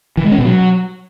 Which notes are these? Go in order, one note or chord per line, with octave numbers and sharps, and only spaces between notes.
E3
G#3
C#4
B2
F#3